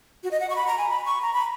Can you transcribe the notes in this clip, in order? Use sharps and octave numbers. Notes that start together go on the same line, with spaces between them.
F#4
D#5
F#5
C#6
B5
A#5
G#5
B5
C#6
A#5
B5